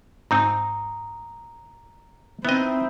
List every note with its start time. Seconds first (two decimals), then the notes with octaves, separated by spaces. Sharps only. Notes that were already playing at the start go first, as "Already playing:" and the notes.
0.31 G#2 C4 D#4 A#5 D#6
2.45 B3 C4 D#4 E4 D#5